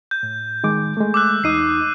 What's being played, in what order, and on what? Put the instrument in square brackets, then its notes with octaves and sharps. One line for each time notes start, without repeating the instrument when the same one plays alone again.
[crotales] G6
[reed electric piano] A2
D#3 G#3 D6
G#3 A3
[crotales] D6 E6 F#6
[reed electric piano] E2 D#4 D#6 [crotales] C7 D#7